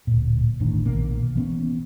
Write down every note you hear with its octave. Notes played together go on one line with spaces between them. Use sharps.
D1 A#2
G1 A2 D#3 D4
A#1 B2 A#3
E3 B3 C#4